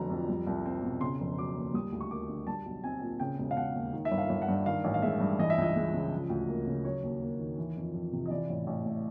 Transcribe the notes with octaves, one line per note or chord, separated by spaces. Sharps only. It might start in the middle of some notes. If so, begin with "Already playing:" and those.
Already playing: F1 D3 F#3 A#5
F2
G3
C2
C4
B2
C#3 C6
F1
F#3 D6
D#2
G3 D#6
D2
C#6
A#3 D6
D3
G3 A5
B1
C4 G#5
A#2
C#3 G5
E1
F5
E1 F#5
D#2
D#3
E5
G1
F5
G1
F#5
G2
D#3 F5
A1
F5
G#3 E5
G2
E3 D#5
E5
C#2 D#5
G#3
C#3
F3
D2
A#3
C#3
F#3 C#5
D#2
A#3
D#3
E3
F2
F2
C3
D#5
E3 D5
A1
A1
A2